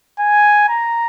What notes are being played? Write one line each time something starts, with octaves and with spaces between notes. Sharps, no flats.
G#5
A#5